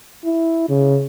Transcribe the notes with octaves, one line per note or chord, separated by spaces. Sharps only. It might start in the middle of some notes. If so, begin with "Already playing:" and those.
E4
C#3